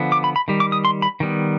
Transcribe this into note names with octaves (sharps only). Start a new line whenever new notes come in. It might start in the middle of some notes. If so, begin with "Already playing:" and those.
Already playing: D3 F3 B3
D6
B5
B5
D#3 G3
D6
D#6
C6
B5
D#3 G3 B3